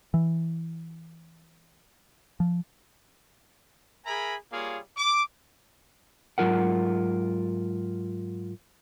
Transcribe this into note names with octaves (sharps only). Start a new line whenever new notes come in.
E3
F3
G#4 A#4 E5 G#5 A#5 B5
G3 A#3 F4 G#4 C#5 F5
D6
G#2 F#3 F4 A#4 F#5